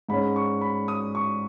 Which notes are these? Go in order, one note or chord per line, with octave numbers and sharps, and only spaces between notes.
G#2 G#3 C#4 B5
C#6
B5
D#6
C#6